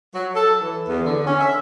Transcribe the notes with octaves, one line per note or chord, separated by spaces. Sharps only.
F#3
A4
E3
E2
D3
C#4
E5